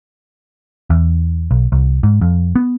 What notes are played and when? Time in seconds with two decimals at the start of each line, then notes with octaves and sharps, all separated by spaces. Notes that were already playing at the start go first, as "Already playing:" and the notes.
0.90 E2
1.51 B1
1.72 C2
2.03 G#2
2.21 F2
2.56 B3